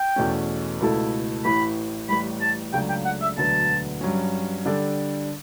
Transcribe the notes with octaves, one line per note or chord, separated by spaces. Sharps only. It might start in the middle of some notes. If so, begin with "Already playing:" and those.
Already playing: G5
E2 B2 A3 C#4
C#2 B2 A3 E4 A4
A1 A2 E3 B5
A1 A2 G3 B5
A5
C#2 C#3 F#3 A3 D4 G5
G5
F#5
E5
E1 D2 D3 F#3 B3 A5
G2 F#3 C#4
D3 G3 D4 A4 D5